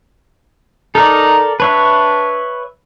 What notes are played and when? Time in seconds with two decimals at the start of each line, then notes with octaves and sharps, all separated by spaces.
0.95 D#4 A4 A#4 D5
1.60 D4 B4 C#5 E5